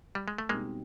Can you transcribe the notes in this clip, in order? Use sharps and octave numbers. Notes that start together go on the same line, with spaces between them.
G3
G#3
A3
B2 G3 G#3 A#3 C4 D#4 G4